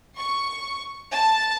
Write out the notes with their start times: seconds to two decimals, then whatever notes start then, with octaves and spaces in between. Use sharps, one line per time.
0.17 C#6
1.12 A5